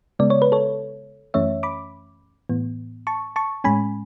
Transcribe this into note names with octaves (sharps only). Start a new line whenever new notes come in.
C#3 G#3 B3 D5
C#5
B4
A4 C#5
F#2 E3 A3 C#4 C#5 E5
B5 D6
A2 E3 B3
A5 C#6
A5 C#6
A2 G#3 C#4 G#5 B5